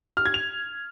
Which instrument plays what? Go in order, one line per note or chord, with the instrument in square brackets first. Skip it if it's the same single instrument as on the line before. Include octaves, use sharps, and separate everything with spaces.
[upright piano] F6
G#6
F7